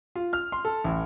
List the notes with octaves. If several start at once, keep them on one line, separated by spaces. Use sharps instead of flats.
F4
F6
C6
A4
A1